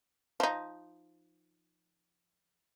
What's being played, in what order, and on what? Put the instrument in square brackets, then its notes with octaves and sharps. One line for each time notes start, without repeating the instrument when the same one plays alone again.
[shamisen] F3 D#4